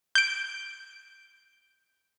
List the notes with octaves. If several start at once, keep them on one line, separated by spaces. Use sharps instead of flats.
G6 D7